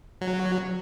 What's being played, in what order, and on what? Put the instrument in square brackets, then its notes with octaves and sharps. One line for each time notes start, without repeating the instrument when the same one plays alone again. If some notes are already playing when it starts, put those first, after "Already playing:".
[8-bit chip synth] F#3